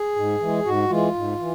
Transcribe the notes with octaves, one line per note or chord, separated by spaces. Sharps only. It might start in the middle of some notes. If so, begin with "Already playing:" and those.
Already playing: G#4
G#2
E3 G#3
G#2 F#4
E3 G#3 F4
G#2
E3